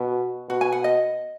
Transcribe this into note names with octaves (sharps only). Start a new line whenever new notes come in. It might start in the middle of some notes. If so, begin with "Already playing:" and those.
Already playing: B2 F#4
B2 F#4
G#5
F#5
D#5